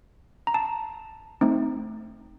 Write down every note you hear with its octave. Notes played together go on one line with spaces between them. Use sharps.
A#5
A5
A3 C4 D#4